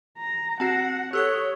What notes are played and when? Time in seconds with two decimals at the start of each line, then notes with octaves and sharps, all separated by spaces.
0.18 A#5
0.60 C4 F#4 F#5 A5 A#6 C7
1.13 G4 A4 C#5 D#6 E6 F#6